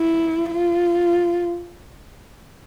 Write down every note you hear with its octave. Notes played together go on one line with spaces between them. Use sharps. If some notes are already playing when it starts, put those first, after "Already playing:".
Already playing: E4
F4